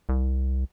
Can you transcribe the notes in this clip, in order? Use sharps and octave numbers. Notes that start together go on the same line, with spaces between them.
C2